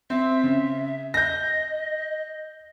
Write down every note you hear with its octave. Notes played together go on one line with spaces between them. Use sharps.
C4 E5
C#3
D#5 G6 A#6